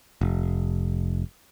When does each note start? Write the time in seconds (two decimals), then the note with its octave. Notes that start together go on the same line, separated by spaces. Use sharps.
0.21 F1